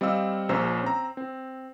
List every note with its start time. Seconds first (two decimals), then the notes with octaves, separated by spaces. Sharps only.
0.01 G3 C4 D#5 F5 E6
0.49 A#1 C#4 C5 C#5 A#5 E6
0.84 C4 A#5
1.17 C4